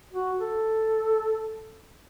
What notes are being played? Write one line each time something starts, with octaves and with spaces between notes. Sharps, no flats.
F#4
A4